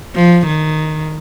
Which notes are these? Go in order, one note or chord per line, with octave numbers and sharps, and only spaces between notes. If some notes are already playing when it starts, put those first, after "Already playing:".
F3
D#3